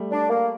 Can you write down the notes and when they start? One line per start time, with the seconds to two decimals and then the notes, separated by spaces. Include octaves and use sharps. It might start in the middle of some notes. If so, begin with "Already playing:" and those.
Already playing: G3 A3
0.11 D4
0.29 A#3